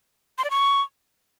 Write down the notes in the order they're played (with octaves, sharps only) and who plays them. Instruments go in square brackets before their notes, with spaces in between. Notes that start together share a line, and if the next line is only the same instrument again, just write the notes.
[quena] C6
D5
C#6